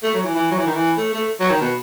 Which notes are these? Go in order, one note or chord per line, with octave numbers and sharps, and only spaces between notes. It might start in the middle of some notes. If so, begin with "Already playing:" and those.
A3
F#3
E3
E3
F#3
E3
D#3
E3
A3
A3
F#3
D#3
B2